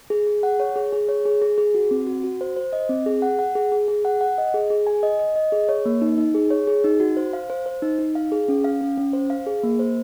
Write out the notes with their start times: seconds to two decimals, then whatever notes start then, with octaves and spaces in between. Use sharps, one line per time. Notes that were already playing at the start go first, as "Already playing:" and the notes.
0.10 G#4
0.27 G#4
0.43 F#5
0.60 C#5
0.76 G#4
0.92 G#4
1.09 C#5
1.25 G#4
1.42 G#4
1.58 G#4
1.75 F#4
1.91 C4
2.07 F#4
2.23 F#4
2.41 C5
2.56 C5
2.73 D#5
2.89 C4
3.06 G#4
3.22 F#5
3.39 F#5
3.55 G#4
3.72 G#4
3.88 G#4
4.05 F#5
4.21 F#5
4.38 D#5
4.54 G#4
4.70 G#4
4.87 G#5
5.03 D#5
5.20 D#5
5.36 D#5
5.52 G#4
5.69 C#5
5.85 A#3
6.01 D#4
6.18 D#4
6.34 G#4
6.50 C#5
6.67 G#4
6.84 D#4
7.00 F#4
7.17 C5
7.33 F5
7.50 C5
7.66 C5
7.82 D#4
7.99 D#4
8.15 F5
8.32 G#4
8.48 C#4
8.64 F5
8.81 C#4
8.98 C#4
9.13 C5
9.30 F5
9.46 G#4
9.63 A#3
9.79 C5